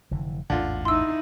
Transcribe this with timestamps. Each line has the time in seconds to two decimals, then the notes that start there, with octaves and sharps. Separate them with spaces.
0.11 F1 D3 E3
0.50 A1 E2 G#2 D3 F4
0.85 D#4 E4 C6 E6